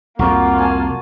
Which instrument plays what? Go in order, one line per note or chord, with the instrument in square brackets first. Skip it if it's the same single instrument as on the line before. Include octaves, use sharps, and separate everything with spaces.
[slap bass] C2 F2 [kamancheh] A#3 F4 [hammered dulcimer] F#4 A#4 D5
[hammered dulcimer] G#5 A5